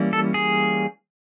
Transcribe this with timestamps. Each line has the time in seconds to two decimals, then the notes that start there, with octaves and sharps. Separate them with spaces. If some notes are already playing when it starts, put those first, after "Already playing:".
Already playing: E3 G3 A#3 C#4
0.13 A4
0.34 G#4